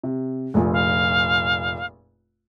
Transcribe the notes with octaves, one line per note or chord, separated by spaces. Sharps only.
C3
F1 A#1
F5